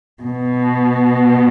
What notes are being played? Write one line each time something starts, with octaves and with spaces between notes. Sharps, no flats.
B2